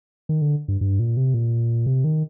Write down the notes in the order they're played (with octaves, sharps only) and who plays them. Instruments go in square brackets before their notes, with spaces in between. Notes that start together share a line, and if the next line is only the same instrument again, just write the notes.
[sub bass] D#3
D3
G2
G2
A#2
C3
A#2
C3
D#3